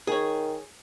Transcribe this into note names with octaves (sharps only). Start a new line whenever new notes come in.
D#3 G#4 C#5